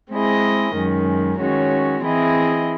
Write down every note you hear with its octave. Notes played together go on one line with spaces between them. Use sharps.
G#3 C4 E4 G#4 D#5
F#2 D#3 G#3 C#4
D#3 G#3 C#4 F#4 C#5
E3 C4 E4 G#4 D#5